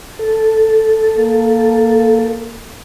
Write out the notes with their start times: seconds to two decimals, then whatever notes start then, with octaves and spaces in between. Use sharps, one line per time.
0.19 A4
1.17 A#3